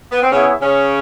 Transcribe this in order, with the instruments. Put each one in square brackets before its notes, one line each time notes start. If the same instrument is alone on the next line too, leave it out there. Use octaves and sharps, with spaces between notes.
[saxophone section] B3
C4
[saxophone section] C#3 C#4 [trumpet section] B3 E4 G#4 C#5 E5
[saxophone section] C#3 C#4